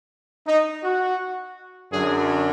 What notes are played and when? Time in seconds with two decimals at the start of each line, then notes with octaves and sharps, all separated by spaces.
0.46 D#4
0.83 F#4
1.92 F#2 D3 F#3 G#4